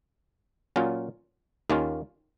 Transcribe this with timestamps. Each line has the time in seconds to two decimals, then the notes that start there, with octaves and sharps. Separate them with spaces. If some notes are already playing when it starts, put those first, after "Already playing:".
0.76 A#2 F#3 C#4 F4
1.70 D#2 D#3 A#3 C#4 F4